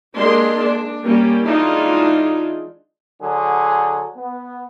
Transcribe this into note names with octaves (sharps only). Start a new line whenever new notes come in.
G#3 A#3 D4 G4 C6
D4
G3 A#3 C#4 G4
E3 G#3 D4 D#4 F4
D3 F#3 G#4
B3